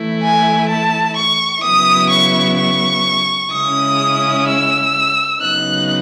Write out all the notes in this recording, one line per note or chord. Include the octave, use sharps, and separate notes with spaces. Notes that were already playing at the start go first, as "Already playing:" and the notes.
Already playing: E3 A3 E4
G#5
A5
C#6
C#3 F#3 B3 E4 D#6
C#6
C#6
C#3 G#3 C#4 E4 D#6
E6
C#3 F#3 B3 D#4 F#6